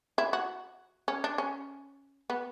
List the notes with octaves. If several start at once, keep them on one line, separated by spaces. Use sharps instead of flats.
E4
F#4
C#4
D4
C#4
B3